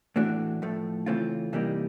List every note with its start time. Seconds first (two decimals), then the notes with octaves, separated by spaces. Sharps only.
0.16 A2 E3 A3 D4 F#4
0.62 A2 F3 A3
1.06 C#3 E3 A3 C4 F4
1.53 C3 E3 G3 A#3 D#4